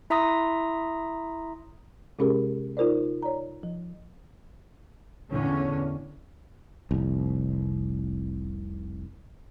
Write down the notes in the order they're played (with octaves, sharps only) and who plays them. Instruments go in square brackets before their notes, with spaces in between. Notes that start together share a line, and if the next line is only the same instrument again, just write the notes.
[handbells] E4 E5 A#5 C6 D#6 A#6
[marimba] C3 G#3 C#4 G4 G#4 A#4
D#4 F4 A#4 C5 D5
C#5 D5 A#5
F3
[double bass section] E2 A2 D3 C#4
[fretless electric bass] F1 C2